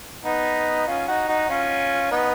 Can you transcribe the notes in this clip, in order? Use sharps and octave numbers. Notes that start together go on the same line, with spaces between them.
B3 D#4
C#4 F4
D#4 F#4
D#4 F#4
C#4 F4
B3 D#4